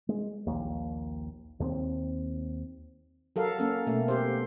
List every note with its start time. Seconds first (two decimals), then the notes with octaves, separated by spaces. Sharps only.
0.09 G#3
0.47 A#1 D#2
1.60 D#2 A#3 C4
3.36 F#3 A4 A#4 F5
3.59 A#3 C#4 A4
3.87 B2 A3
4.08 G4 C5